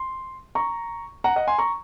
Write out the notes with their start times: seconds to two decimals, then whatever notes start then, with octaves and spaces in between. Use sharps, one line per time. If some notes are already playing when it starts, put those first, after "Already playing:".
Already playing: C6
0.55 A#5 C#6
1.24 F#5 A#5
1.36 D#5 F#5
1.48 G#5 C6
1.58 A#5 C#6